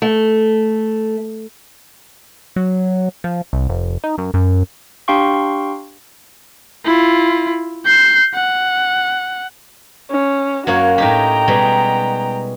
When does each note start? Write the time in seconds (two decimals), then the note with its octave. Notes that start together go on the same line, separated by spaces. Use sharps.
0.02 A3
2.56 F#3
3.24 F3
3.53 C2
3.69 F1
4.04 D#4
4.18 F#2
4.34 F#2
5.08 D4 G4 F5 G5 C6 C#6
6.85 E4 F4
7.85 G6 C7
8.34 F#5
10.11 C#4
10.67 F#2 A#3 F#4 C#5
10.98 A2 D#4 G4 G5 A#5
11.48 B2 G3 G#3